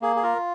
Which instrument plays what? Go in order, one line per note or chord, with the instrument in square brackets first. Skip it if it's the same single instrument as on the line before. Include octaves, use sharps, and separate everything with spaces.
[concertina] A#3 G#4
G#4
F4 A#4